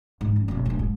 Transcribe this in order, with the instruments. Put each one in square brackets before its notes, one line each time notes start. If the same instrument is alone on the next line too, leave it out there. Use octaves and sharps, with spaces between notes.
[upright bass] G#2 E3
C#4
F#1 B2
D1 A#1
G#2